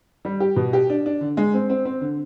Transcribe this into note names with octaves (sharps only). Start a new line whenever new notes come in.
G3
G4
B2
G4
D4
D4
D3
G#3
C4
C4
C4
D3